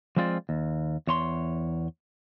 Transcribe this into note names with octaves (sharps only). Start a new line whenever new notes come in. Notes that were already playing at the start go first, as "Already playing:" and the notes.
F3 G#3 C4 F4 D5
D#2
E2 C#5 C6